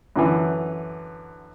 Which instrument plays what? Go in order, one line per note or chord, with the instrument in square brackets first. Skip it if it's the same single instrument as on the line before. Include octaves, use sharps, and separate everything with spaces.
[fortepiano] F#2 D3 E3